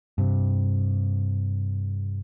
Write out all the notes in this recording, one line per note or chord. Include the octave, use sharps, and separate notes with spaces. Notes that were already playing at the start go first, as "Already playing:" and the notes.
G2 C3